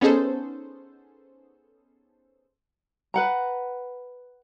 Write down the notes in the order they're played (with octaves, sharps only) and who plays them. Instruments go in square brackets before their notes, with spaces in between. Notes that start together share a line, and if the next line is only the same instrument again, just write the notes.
[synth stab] B3 C#4 D#4 G#4 A4 C5
[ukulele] B4 F#5 A#5